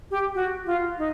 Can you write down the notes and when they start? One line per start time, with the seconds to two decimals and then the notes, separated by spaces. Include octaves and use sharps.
0.11 G4
0.35 F#4
0.66 F4
0.98 D#4